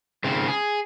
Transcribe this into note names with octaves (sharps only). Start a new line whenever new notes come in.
G#2 C#3 C4
G#4